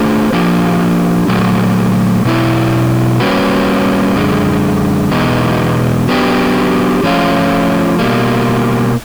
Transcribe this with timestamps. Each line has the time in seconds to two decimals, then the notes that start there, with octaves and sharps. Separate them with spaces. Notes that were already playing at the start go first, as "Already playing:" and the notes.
Already playing: A3 D4 F4 G#4 C5
0.33 F3 A#3 D4 G4
1.28 A#2 F#3 A3
2.25 B2 F#3 B3 E4
3.20 G3 A#3 C#4 F#4 B4
4.16 F#2 D3 G#3
5.11 E2 B2 G#3 B3 D#4
6.08 F#3 B3 D4 G4
7.03 F3 A3 C#4 F4
7.99 B2 G3 A#3